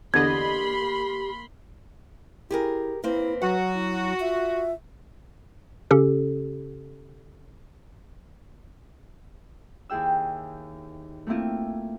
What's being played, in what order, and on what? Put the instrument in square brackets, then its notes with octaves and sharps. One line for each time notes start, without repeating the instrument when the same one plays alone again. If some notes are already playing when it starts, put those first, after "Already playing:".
[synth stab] E2 D3 D#5 [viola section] A#3 B5 C6 [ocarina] G4 [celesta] G#6
[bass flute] E4 [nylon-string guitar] G4 G#4 A#4
[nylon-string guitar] A#3 C4 [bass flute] E4 [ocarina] B4
[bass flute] F#3 [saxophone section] F#4 [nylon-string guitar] F#5
[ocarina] E4
[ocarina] F4 [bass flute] E5
[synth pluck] C#3 C#4 G4 A4
[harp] D#2 E4 G#4 G5 E6
A3 A#3 C4 E4 F4